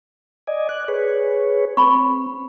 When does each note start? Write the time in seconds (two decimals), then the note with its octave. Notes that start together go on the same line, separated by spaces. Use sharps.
0.47 D5 D#5 G#5
0.69 D5 F#6
0.88 G#4 B4 C#5
1.77 C4 B5 C#6